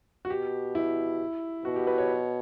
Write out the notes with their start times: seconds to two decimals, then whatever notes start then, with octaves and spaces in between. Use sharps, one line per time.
0.25 F#4
0.30 B2 G4
0.75 E4
1.65 B2 F#4
1.76 G4
1.87 B4
1.98 C#5